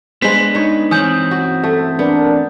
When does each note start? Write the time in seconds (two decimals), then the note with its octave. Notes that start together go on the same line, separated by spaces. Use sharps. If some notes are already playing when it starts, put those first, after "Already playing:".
0.22 G#3 B3 D4 B4 C5 B6
0.55 D#4 C#5
0.91 E3 C4 C#4 D#6 G6
1.31 F#4
1.64 A3 A4
1.99 B3 D4 A#4